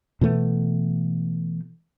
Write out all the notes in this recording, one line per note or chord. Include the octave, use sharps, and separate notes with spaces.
B2 E3 A3 B3